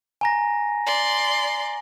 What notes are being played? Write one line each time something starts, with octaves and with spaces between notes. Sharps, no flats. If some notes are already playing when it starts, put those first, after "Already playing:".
G#5 A#5 A#6
D5 C6